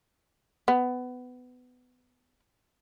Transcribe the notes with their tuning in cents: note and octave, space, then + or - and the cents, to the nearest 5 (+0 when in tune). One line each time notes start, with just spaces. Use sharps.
B3 +20